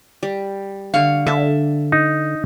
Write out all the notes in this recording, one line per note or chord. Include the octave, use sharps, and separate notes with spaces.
G3
D3 F5 C#6
D3 E5 A5
D#4